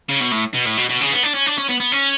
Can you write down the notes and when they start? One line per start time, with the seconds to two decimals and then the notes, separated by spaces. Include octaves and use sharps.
0.09 C#3
0.20 B2
0.31 A2
0.54 B2
0.66 A2
0.77 B2
0.89 B2
1.01 C#3
1.11 B3
1.23 D4
1.34 C#4
1.46 D4
1.58 C#4
1.69 B3
1.80 B3
1.92 C#4